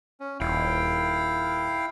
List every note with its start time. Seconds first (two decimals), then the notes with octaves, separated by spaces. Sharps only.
0.20 C#4
0.40 D#1 E4 F5 G5